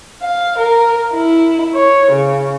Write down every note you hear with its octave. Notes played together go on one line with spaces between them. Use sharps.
F5
A#4
E4
C#5
C#3